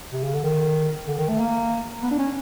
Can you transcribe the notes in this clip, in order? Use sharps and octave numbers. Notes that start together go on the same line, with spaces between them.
C3
C#3
D3
D#3
D3
D#3
A3
A#3
B3
D4
C#4